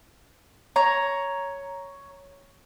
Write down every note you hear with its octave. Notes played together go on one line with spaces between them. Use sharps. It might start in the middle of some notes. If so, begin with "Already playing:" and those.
C#5 A#5